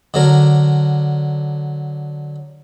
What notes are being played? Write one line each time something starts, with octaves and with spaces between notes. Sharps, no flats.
D3 F#3 A#4